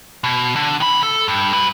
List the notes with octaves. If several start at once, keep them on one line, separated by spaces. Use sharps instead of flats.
B2
D3
D#3 B5
A4
G2
F#3 B4